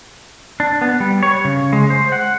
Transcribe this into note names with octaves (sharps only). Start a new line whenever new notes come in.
D4
B3
G3
C#5
C#3
G#3
C5
F#5